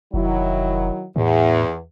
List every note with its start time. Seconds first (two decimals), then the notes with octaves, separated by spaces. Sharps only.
0.14 F1 D#3 F#3 E4
1.16 E2 A2